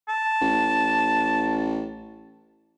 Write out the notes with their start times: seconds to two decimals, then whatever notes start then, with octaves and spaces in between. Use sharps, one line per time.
0.09 A5
0.41 A1